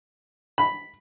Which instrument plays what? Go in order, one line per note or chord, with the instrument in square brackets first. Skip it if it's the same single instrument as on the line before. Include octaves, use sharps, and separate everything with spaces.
[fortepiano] B5